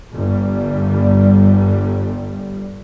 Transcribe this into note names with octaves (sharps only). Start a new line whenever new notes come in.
G1 G3